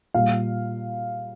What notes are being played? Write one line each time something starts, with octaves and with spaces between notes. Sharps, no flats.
A#2 G3 F5